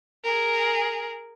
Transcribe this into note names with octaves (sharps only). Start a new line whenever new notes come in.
G#4 A#4